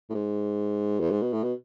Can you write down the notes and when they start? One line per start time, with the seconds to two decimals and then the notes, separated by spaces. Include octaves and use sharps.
0.10 A2
0.14 G#2
1.00 E2
1.11 G#2
1.22 B2
1.33 A2
1.43 B2